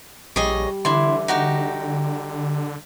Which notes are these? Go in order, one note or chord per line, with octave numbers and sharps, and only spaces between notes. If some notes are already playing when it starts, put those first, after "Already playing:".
A#1 G3 G#4 C#5 D#5
D3 E3 E4 D5 C6
D#4 F#4 G4